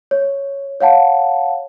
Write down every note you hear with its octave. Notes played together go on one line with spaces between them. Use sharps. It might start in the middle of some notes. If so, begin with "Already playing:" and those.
C#5
C#5 F5 F#5 A5